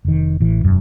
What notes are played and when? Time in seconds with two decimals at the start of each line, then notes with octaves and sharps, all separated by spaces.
0.05 F1 D#3
0.40 A1 E3
0.63 E1 F#2